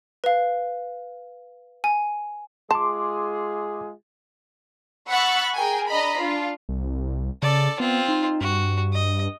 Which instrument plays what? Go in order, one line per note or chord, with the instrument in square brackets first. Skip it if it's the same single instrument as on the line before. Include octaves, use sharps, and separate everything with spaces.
[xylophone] B4 F5
G#5
[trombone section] G#3 F4 G#4 [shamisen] A5 [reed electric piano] C6 D6
[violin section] F#5 B5 C#6 E6 F#6 A6
G#4 A#4 G5 G#5
D4 D#5 A#5 B5
D4 F4
[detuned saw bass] C2
[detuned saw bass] C#3 [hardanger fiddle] A4 D5
[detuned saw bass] B3 [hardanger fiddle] C4 F4
[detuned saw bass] D#4
[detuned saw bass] G2 [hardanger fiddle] F#4
[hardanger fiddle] D#5